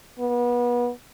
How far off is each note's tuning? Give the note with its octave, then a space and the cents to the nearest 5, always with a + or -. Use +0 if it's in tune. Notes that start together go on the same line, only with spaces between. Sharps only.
B3 -30